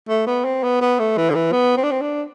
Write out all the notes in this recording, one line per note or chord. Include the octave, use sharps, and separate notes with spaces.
A3
B3
C4
B3
B3
A3
E3
D3
E3
B3
C4
D4
C4
D4